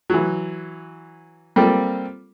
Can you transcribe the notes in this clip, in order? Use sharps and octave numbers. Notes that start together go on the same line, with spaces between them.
E3 F#3
G3 A#3 C4 F4 A4